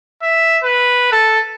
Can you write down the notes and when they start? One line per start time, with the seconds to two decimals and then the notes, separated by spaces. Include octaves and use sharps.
0.23 E5
0.64 B4
1.12 A4